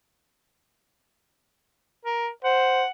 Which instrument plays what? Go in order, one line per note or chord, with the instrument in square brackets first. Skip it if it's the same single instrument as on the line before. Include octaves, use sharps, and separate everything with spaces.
[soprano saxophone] A#4
[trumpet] C5 [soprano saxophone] F#5